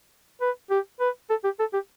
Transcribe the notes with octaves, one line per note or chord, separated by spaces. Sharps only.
B4
G4
B4
A4
G4
A4
G4